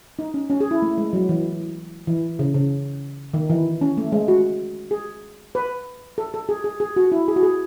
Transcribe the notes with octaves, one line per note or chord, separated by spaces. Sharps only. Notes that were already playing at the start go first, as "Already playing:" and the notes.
D#4
C#4
C#4
G#4
E4
A3
G#3
F#3
E3
E3
C#3
C#3
D#3
E3
C#4
A3
G#3
F#4
G#4
B4
A4
A4
G#4
G#4
G#4
F#4
E4
G#4
F#4
G#4